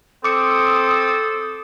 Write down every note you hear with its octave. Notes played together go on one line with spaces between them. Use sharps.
C4 A4 D6 D#6 C#7